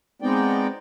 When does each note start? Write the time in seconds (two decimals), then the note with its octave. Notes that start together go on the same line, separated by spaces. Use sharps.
0.22 G#3 B3 C4 D#4 D5 G5